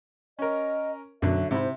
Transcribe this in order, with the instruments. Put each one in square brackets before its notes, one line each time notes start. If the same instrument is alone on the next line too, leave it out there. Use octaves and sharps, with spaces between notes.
[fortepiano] C#4 A#4 [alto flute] D#5
[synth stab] B1 F#2 [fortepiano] D3 F#3 [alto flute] E5
[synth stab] G#2 E4 [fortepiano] C3 [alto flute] C5